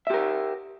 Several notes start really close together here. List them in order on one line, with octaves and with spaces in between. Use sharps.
E5 G4 A#4